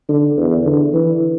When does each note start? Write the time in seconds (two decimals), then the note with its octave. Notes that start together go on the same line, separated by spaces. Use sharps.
0.09 D3
0.38 E2
0.66 D3
0.94 E3